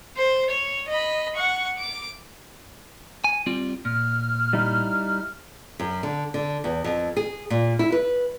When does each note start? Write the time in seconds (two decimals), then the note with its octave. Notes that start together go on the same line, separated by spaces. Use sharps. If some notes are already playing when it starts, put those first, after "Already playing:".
0.17 C5
0.50 C#5
0.89 D#5 B5
1.36 F#5 C#6
1.78 D6
3.24 G#5
3.46 G3 C4 F4
3.85 A#2 F6
4.53 G3 D#4 E4
5.79 F#2
6.03 D3
6.34 D3
6.64 E2
6.84 F2
7.17 G#4
7.50 A#2
7.79 E4
7.92 B4